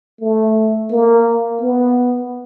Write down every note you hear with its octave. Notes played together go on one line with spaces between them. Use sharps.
A3
A#3
B3